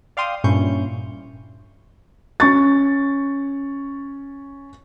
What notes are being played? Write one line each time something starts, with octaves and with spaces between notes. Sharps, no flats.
D5 F5 G5 C6 D#6
G2 A#2 C#4 E4 C#6 G6
C#4 C#6 A6